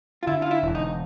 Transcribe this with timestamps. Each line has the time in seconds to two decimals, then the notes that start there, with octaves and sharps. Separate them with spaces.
0.23 F4
0.27 D3 E4
0.42 F4
0.51 E4
0.63 E1
0.75 D#4